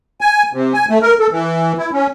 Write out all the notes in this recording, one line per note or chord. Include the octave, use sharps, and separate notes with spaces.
G#5
C3
G#5
A3
A#4
A4
E3
E4
C#4